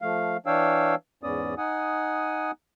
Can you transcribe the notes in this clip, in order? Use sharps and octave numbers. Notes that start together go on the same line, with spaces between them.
F3 A3 F5
E3 D4 C#5 F5 G5 E6
E2 G#2 B3 C#4 D5 D#6
D#4 F#5 G#5 D#6